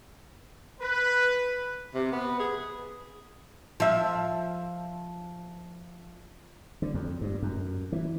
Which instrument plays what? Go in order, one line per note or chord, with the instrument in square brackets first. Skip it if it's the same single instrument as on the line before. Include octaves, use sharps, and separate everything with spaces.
[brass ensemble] B4
[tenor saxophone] C3
B3
G#4
[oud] F3 E5
[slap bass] D3
F2
G2
F#2
E3